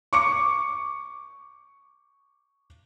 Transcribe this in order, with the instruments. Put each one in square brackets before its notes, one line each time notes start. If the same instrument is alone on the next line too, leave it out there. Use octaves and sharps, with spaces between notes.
[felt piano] C#6 D6 C#7